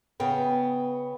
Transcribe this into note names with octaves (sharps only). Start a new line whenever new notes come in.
C#3 B3 G5